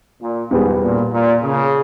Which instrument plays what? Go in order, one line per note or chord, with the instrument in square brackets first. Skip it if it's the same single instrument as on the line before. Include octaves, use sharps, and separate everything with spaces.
[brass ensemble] A#2
[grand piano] E2 B2 G3 B3 [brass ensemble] G#2
[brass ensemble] A#2
A#2
C#3